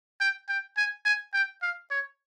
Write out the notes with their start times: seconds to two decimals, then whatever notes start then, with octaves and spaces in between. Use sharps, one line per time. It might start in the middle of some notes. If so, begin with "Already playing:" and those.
0.20 G5
0.49 G5
0.77 G#5
1.05 G#5
1.34 G5
1.62 F5
1.91 C#5